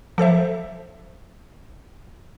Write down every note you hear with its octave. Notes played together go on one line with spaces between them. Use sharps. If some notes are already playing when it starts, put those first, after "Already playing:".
F3 A4 C5 E5